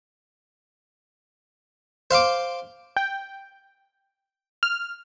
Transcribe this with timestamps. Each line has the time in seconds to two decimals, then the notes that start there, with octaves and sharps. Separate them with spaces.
2.11 C5 F5 C6 D6
2.96 G5
4.63 F6